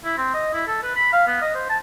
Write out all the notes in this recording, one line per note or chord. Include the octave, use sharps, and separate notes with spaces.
E4
C4
D#5
E4
A4
B4
B5
F5
B3
D#5
C5
A5